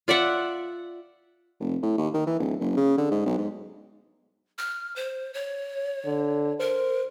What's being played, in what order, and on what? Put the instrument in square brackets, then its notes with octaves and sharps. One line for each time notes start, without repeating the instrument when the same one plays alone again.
[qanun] F4 D5 E5 F#5
[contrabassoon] F1
A2
D#2
D#3
E3
D1
F#1
C#3
D3
G#2
B1
G#2
[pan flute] F6
C5
C#5
[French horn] D3
[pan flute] A#4 [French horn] C5